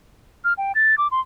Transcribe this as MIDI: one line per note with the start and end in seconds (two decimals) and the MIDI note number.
0.44 0.53 89
0.58 0.72 79
0.75 0.95 93
0.98 1.07 86
1.11 1.20 84